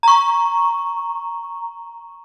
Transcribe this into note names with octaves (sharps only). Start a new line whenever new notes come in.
A#5 C#6